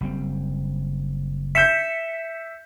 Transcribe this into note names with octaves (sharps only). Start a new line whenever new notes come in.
F#1 G3 C4
E5 G6 B6 C#7 E7